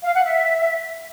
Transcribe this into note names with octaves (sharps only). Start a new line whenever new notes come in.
F5
F#5
E5